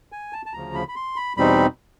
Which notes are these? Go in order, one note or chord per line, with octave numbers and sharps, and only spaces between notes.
G#5
A5
A5
D2 C#3 F3 A#5
B5
B5
C6
B5
E2 B2 G3 C4 D#4 B5